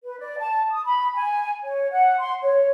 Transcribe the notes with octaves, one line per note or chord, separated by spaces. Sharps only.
B4
D5
A5
D#6
B5
G#5
C#5
F#5
C6
C#5